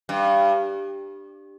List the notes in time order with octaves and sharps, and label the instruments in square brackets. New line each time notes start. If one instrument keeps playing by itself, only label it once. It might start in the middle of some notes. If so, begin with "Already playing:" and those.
[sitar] G2